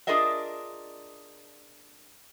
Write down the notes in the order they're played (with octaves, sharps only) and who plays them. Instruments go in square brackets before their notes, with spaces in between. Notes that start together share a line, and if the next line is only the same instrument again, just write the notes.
[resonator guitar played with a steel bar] D4 F4 G#4 A#4 D#5 E5